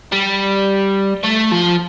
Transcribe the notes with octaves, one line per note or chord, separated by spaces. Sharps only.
G3
A3
F3